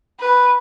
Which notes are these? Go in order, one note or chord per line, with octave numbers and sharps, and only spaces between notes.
B4